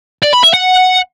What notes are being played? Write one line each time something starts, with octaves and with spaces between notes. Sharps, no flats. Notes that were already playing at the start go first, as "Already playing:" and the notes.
D5
B5
E5
F#5